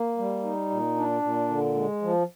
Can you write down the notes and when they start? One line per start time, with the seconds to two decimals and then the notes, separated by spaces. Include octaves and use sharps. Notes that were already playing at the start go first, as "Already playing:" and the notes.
Already playing: A#3
0.18 G3
0.44 D#4
0.70 A#2
0.96 D4
1.22 A#2
1.49 D3
1.75 G#3
2.02 F3